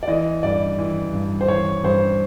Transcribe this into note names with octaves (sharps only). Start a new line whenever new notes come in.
D5
E3 D#5
G2 D5
E3
G2
C5
E3 C#5
G2 C5